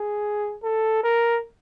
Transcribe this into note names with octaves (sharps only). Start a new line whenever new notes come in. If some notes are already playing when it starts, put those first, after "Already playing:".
Already playing: G#4
A4
A#4